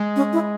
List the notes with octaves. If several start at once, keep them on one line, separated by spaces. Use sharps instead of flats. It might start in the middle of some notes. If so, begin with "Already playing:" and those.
Already playing: G#3
C#4
E4